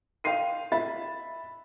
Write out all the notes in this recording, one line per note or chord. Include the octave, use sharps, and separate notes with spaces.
F5 G5 C6 C7 D#7
E5 B5 A6